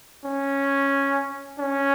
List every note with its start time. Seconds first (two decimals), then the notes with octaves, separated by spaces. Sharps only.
0.24 C#4
1.59 C#4